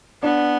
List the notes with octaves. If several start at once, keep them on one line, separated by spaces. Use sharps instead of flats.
B3 D4